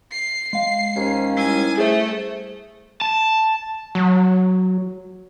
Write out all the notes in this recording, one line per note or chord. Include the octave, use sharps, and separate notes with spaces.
C7
G#3 F5
D#2 C#4 C5
G3 E4 G#5
A3 G#4 C5
A5
F#3